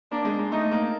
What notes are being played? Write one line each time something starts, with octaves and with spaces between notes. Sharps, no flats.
A#3 D4
G#3
G#3
A3 D#4
A#3